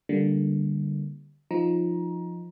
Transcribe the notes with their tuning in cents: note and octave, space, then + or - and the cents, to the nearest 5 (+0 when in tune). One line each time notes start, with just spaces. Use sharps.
D3 +0 G3 +0 A#3 +0
F3 +0 D#4 +0 A#5 +20